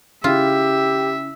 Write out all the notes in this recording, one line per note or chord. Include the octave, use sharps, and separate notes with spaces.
C#3 E4 F4 G4 E5